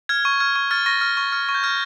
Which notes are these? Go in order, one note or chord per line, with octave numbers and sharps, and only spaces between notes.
F6 G#6
C#6
F6 G#6
C#6
F6 A6
C#6 A#6
F6
C#6
F6
C#6
G6
F6 G#6